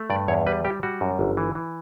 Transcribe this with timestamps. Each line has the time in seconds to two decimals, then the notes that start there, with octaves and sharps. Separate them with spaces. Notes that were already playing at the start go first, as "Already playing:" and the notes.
Already playing: A3
0.10 G2 D5
0.28 E2 C#5
0.46 G3 B4
0.65 G3 G4
0.83 G3 F#4
1.01 F#2
1.19 G1
1.37 E3
1.55 E3